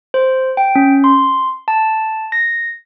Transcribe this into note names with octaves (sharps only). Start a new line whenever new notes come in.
C5
G5
C#4
C6
A5
A#6